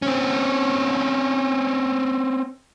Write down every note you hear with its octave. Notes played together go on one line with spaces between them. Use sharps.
C4 C#4